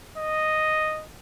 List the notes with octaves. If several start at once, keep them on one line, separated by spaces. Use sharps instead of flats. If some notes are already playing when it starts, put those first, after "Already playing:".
D#5